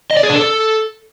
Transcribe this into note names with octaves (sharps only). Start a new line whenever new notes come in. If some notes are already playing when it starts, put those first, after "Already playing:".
D#5
D5
G#4
D4
A4